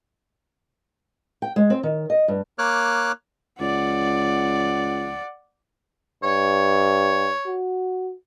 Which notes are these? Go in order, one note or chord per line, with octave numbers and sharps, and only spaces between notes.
G5
G#3
C4
D#3
D#5
G2
A#3 C#5 D6 F6 F#6
C#2 D5 F#5
G2 C#5
F#4